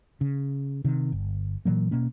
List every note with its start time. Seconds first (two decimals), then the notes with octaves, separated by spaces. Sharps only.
0.21 C#3
0.84 C3 D#3
1.12 G1
1.65 A#2 E3 F#3 A#3
1.91 B2 A#3 C#4